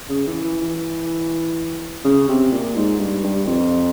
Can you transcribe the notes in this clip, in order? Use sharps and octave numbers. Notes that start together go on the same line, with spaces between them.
C#3
E3
E3
E3
C#3
C3
A#2
G#2
G2
G2
F2